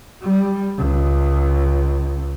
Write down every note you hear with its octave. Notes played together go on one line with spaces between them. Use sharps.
G3
C#2